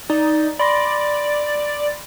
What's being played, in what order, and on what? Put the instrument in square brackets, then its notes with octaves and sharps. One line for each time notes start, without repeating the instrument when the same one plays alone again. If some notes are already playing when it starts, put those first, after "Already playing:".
[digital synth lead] D#4 [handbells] D5
[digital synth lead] D5 [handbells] B5 C6 A#6